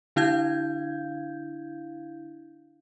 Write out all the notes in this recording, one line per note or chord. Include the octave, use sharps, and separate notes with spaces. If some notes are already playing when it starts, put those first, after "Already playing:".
D3 D4 E4 F5 G6 G#6